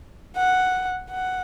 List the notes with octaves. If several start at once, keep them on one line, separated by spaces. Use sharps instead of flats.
F#5
F#5